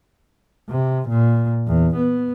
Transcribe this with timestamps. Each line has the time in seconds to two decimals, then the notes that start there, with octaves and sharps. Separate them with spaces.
0.69 C3
1.08 A#2
1.67 E2
1.96 B3